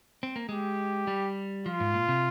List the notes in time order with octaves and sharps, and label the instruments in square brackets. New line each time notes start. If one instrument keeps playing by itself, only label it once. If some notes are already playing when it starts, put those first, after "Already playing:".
[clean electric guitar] C4
A#3
[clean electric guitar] G#3 [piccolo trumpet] G4
[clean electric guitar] G3
[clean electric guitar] F3 [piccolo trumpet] F4
[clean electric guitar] G#2
A#2
C3